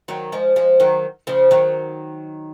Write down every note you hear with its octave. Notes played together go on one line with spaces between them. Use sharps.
D#3 F#3
F3 G#3
F3 G#3
D#3 F#3
C#3 F3
D#3 F#3